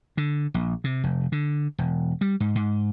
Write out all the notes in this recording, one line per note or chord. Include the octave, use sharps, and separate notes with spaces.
D3
A#1
C3
F1
D3
E1
G3
G#2
G#2